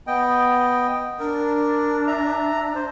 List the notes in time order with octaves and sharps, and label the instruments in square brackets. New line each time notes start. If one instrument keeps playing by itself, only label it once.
[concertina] B3 D#5 G5
[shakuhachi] D4 [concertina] A#4
[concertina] E5 A#5
C5